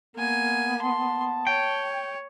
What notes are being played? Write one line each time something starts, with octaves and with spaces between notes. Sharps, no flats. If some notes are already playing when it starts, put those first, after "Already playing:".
A#3 B3 G#5
A5 C6
C#5 G5